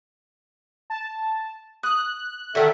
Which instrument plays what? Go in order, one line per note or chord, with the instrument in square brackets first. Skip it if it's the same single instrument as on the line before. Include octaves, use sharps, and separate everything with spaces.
[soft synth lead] A5
[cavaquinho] D#6 [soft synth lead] F#6
[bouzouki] D3 D#3 [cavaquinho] F#4 [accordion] A4 E5